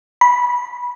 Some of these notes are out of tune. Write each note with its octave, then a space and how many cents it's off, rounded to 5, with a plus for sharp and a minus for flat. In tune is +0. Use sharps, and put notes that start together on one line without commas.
B5 -20